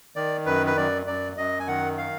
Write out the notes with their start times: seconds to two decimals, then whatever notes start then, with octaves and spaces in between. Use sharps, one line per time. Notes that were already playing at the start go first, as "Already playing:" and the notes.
0.16 D#3 D5
0.46 F#2 B4
0.67 B4
0.77 F#2 D5
1.06 F#2 D5
1.37 F#2 D#5
1.60 G#5
1.67 D#3 F#5
1.98 F5